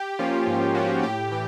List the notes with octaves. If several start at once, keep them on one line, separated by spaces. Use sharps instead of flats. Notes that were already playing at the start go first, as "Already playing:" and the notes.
Already playing: G4
F3 A#3 C#4 F4
G#2
F3 A#3 C#4 F4 F#4
A2 G4
E3 G4